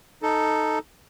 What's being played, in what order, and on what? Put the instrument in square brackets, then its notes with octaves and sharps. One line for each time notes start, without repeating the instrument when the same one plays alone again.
[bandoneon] D#4 A4